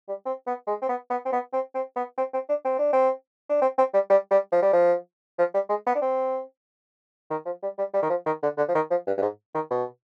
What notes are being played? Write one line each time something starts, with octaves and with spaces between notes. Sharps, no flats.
G3
C4
B3
G#3
C4
B3
B3
C4
B3
C4
C4
B3
C4
C4
D4
C4
D4
C4
D4
C4
C4
G3
G3
G3
F3
G3
F3
F3
G3
G#3
B3
D4
C4
D#3
F3
G3
G3
G3
D#3
F3
D#3
D3
D3
F3
D#3
F3
G2
G2
G#2
D#3
B2